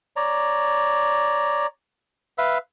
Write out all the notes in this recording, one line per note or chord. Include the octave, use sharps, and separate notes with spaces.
C#5 D5 A#5
B4 E5 F5 E6